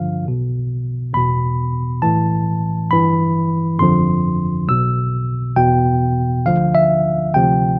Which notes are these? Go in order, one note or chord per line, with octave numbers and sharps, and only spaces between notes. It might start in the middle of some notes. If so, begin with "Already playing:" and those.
Already playing: G1 G2 D3 F3 F5
B1 B2
E2 B2 B5
B1 A2 E3 A5
G1 G2 E3 B5
G1 F2 D3 F3 C6
B1 B2 E6
E2 B2 G5
D2 D3 F3 F5
E5
D2 C3 F3 G5